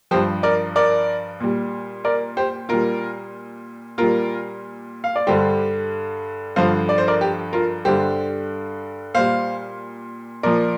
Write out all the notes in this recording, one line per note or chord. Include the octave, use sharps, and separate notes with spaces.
G2 F3 G4 C5
A#4 D5
A#4 D5
A#2 G3
A#4 D5
G4 C5
A#2 G3 F4 A#4
A#2 G3 F4 A#4
F5
D5
G2 D3 G3 G4 C5
G2 D3 F3 C5 F5
D5
C5
A#4 D5
G4
F4 A#4
G2 D3 G3 G4 C5
A#2 G3 C5 F5
A#2 F3 A#4 D5